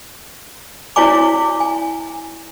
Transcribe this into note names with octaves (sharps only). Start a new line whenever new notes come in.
E4 F#4 C#5 D5 G#5 D6
G#5